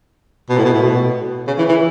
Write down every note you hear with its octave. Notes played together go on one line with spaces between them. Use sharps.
B2
A2
B2
A2
B2
C#3
E3
E3